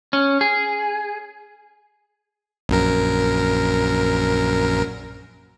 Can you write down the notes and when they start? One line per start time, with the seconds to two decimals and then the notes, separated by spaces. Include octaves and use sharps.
0.13 C#4
0.41 G#4
2.69 A#1 F#2 A#4